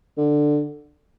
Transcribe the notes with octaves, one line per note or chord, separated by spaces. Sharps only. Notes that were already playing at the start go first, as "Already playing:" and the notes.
D3